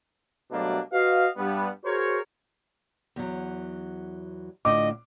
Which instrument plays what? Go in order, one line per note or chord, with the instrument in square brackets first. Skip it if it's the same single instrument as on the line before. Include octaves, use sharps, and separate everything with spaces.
[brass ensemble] B2 F#3 G3 A3 A#3 D4
F#4 B4 D#5 F5
G2 G3 B3
F#4 G#4 A#4 C5 C#5
[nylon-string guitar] E2 F#3
[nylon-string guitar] A2 D3 F4 [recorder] D#5 [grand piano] D6